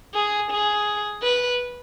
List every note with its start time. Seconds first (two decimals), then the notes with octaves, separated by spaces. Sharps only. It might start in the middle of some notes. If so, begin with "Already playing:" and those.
0.14 G#4
0.51 G#4
1.22 B4